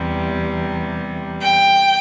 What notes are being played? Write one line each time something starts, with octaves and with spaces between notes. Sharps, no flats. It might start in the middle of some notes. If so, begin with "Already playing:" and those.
Already playing: E2 C3 G3
G5